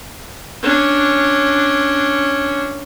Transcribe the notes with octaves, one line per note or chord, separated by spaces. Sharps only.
C#4 D4